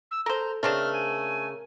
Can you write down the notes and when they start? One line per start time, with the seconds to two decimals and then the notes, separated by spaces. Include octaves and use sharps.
0.11 E6
0.26 A4 A#4 C5 A#5
0.63 C#3 A3 C4 D4 A#4 F6
0.93 G#5